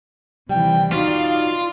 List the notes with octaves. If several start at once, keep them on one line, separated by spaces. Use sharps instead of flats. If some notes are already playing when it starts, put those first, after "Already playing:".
D#2 C3 E3 G3 G5
B3 D#4 F4 F#4 D5 F5